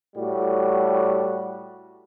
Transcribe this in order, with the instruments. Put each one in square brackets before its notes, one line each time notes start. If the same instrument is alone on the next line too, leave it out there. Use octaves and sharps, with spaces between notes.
[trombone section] A2 G3 F#4